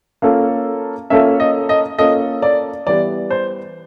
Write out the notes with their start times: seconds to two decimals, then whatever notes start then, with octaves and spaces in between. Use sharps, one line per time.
0.22 A#3 C#4 F4 A4
1.10 A#3 C#4 F4 A4 E5
1.40 D#5
1.69 D#5
1.99 A#3 C#4 F4 A4 D#5
2.42 D5
2.87 E3 G3 B3 D5
3.30 C5